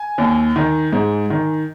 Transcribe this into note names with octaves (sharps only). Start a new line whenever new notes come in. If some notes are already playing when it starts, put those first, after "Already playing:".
Already playing: G#5
D#2
D#3
G#2
D#3